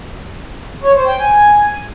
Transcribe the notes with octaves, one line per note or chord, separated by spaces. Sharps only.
C#5
C5
G5
G#5